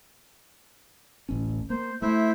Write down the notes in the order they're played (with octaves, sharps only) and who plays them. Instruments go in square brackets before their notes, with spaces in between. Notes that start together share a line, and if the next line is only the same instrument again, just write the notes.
[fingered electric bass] D1 A1 C#4
[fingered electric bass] A#3 [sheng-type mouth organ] C5
[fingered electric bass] A3 [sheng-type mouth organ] E4 C5 E5